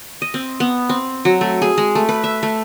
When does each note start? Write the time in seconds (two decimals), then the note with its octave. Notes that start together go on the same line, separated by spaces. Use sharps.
0.22 D#5
0.34 C4
0.60 B3
0.89 C4
1.25 F#3
1.41 A3
1.62 G#4
1.78 G#3
1.95 A3
2.09 B4
2.24 E5
2.43 A3